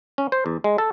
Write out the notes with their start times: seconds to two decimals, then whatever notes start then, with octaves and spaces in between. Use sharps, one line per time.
0.18 C#4
0.32 C5
0.46 E2
0.64 G#3
0.78 A4